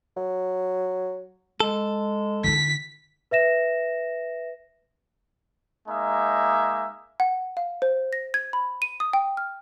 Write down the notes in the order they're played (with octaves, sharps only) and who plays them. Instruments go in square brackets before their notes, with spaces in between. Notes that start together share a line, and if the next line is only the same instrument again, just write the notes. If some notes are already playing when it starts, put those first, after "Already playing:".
[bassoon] F#3
[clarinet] G#3 [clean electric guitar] A4
[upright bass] D3 D#4 [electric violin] B6
[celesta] B4 E5 A#6 E7
[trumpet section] G#3 A#3 D#4 E5
[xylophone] F#5
F5
C5
A#6
G#6
B5
D#7
D#6
G5
F6